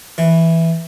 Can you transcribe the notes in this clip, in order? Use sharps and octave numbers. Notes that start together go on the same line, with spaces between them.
E3